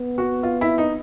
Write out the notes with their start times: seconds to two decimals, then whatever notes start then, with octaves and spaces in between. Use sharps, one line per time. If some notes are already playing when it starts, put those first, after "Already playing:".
Already playing: B3
0.18 F#4
0.43 F4
0.61 E4
0.78 D#4